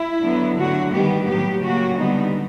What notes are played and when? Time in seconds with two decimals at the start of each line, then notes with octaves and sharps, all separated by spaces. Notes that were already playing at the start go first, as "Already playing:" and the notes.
Already playing: E4
0.23 D3 F#3 B3
0.58 D3 F#3 A3 F#4
0.92 D#3 G3 B3 G4
1.27 A2 F#3 B3 G4
1.62 C#3 F#3 A#3 F#4
1.98 D3 G3 B3 D#4